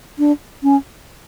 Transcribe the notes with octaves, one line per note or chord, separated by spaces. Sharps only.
D4
C#4